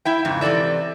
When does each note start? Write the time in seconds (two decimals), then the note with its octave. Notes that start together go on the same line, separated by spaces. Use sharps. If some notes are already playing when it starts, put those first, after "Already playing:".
0.05 E4 E5 G5
0.25 F2 G#2 C#3
0.41 C3 E3 A4 D5 E5